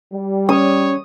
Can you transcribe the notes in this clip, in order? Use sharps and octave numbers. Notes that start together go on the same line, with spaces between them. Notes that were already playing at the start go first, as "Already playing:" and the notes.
G3
C#4 C#5 D#6